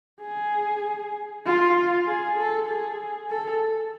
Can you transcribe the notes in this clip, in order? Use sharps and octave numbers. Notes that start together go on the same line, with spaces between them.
G#4
F4
G#4
A4
G#4
A4